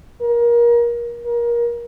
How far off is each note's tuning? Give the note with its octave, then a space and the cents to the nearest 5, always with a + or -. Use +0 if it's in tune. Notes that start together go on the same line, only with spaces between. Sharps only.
A#4 +25
A#4 +25